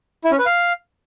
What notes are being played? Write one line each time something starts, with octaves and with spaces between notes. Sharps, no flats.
E4
C#4
B4
F5